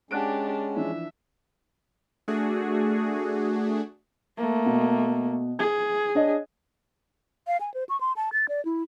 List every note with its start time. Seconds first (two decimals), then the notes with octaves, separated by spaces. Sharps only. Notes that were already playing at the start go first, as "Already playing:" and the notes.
0.11 G#3 C#4 D4 G4 F#5 F#6 D7
0.76 E3 F3 D4 E5
2.28 A3 D4 F#4 G#4
4.37 A3 A#3
4.66 B2
5.59 G#4 G#6
6.15 D4 C#5 D#5
7.47 F5
7.61 G#5
7.74 C5
7.89 C#6
8.01 C6
8.16 A5
8.33 A6
8.49 D5
8.65 E4